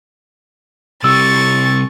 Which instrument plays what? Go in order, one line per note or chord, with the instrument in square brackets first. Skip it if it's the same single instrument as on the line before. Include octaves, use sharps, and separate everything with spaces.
[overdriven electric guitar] C3 G3 [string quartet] C#6 A6 [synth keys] E6